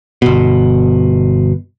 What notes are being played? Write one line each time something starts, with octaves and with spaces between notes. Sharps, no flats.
G1 B2